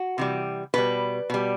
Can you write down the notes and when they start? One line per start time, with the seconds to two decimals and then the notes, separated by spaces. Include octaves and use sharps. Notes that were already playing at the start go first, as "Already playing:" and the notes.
Already playing: F#4
0.18 C3 E3 G3
0.74 B2 G3 B4
1.30 B2 G3